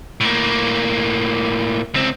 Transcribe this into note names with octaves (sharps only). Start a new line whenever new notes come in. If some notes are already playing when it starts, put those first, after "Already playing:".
A2 A#3
C#2 C4